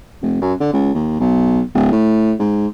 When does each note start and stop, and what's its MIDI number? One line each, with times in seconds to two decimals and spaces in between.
0.22 0.37 29
0.41 0.53 42
0.60 0.69 50
0.73 0.92 37
0.95 1.15 39
1.20 1.60 35
1.74 1.89 26
1.92 2.32 45
2.39 2.67 44